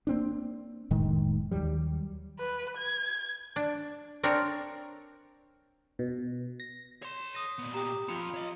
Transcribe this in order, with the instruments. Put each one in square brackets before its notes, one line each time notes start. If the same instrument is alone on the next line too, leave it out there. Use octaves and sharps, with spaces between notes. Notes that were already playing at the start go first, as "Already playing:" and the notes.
[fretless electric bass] A#3 C4 D4
F1 A2 D#3 G#3
D#2 D#3 F#3 G3
[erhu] B4
G#6
[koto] D4
C4 D4 A#4 C#5
[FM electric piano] B2
A#6
[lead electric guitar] C#5 C6
[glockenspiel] D#6 A#6 D#7
[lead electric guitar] A#2 B3
[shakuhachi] G4 [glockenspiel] A#5 D#6
[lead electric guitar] F3 C4 [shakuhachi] F4 [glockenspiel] B5 C#7
[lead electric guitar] C#5 D#5